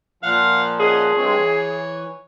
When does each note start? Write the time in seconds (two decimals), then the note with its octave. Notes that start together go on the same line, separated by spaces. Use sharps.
0.23 A#2 F3 F5 F#5 F6
0.79 C#4 G#4 D#5 F#5
1.17 G2 G#3 C4 C#5
1.38 E3